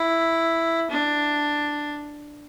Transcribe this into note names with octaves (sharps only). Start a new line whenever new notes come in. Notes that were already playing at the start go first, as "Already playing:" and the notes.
Already playing: E4
D4